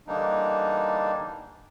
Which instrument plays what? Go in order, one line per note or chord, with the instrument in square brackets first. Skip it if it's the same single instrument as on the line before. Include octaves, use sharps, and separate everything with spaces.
[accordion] D3 E3 G3 A#3 D4 D#4